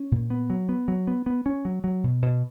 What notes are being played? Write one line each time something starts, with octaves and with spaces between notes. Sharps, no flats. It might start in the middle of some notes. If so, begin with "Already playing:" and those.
Already playing: C#4
A#2
B3
F#3
B3
F#3
B3
B3
C#4
F#3
F#3
B2
B2